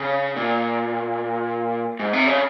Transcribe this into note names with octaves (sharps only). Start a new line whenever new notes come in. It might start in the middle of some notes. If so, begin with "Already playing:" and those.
Already playing: C#3
A#2
G#2
C3
C#3